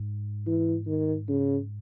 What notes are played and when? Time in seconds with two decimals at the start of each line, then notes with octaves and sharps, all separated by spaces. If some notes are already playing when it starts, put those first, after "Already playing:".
Already playing: G#2
0.46 E3
0.87 D#3
1.28 C#3